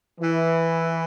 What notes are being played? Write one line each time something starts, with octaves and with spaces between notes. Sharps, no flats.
E3